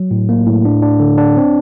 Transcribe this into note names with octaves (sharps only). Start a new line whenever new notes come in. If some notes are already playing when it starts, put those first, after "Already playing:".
Already playing: F#3
A2
A#3
A2
D4
D4
D3
D4
C4